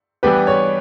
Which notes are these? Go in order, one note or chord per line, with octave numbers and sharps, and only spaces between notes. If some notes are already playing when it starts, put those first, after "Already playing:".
E3 G3 B3 D4 G4 B4
C#5